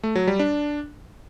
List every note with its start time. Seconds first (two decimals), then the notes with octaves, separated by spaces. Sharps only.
0.03 A3
0.15 F#3
0.27 G3
0.39 D4